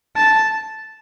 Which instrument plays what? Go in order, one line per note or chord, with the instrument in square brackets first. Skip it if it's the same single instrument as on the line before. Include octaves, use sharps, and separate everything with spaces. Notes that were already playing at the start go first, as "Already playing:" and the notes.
[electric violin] A5